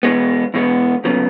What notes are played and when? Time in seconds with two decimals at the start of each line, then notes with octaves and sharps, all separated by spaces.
0.03 E2 B2 G#3 B3
0.54 E2 B2 G#3 B3
1.04 D2 C#3 F#3 B3